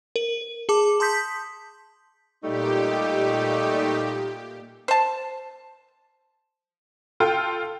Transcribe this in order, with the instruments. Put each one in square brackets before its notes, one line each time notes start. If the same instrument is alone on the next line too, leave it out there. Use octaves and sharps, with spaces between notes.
[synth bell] A#4
G#4 A5 D6
A5 C6 D#6 G6 B6
[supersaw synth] A#2 G4 [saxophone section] G3 A3 D#4
[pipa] C5 A5
[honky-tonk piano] F4 A4 G5 F6